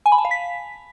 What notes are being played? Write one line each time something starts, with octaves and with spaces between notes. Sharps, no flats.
G#5
B5
A5
F5
B6